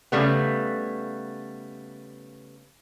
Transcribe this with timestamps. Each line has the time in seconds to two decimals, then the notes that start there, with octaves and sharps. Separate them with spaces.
0.12 C#3 G3 A3 B3